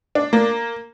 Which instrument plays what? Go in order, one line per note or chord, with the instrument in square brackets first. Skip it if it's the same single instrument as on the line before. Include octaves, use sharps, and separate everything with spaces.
[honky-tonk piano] D4
A#3